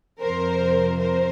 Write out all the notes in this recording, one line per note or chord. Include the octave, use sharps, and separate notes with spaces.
F2 C3 F3 A#4 C5
A#4 C5